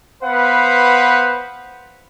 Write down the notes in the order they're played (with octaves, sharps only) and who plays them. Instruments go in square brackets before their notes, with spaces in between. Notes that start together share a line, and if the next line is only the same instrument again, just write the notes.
[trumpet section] B3 B4 C5 F5 F#5